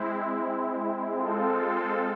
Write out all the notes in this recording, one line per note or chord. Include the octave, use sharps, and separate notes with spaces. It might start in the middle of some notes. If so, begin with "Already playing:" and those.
Already playing: G#3 C4 E4
G#3 C4 F4 A4